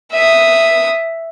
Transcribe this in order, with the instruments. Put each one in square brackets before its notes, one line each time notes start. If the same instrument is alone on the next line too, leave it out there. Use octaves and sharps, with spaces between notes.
[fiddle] E5 D#6